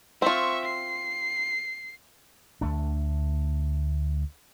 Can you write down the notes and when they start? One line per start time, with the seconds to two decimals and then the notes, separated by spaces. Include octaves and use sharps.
0.22 C4 F4 E5 C#6
0.65 C7
2.61 D2 A3 D4